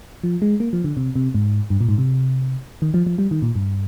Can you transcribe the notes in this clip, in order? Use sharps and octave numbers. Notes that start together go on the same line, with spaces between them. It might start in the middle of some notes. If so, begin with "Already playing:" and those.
F3
G#3
A#3
F3
D3
C3
C3
G#2
G2
A#2
G#2
C3
D#3
F3
F3
G3
D#3
A#2
G2